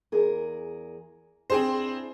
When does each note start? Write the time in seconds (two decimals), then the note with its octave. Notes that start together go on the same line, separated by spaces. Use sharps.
0.12 E2 G#4 A#4
1.50 C4 D4 E4 G#4 C5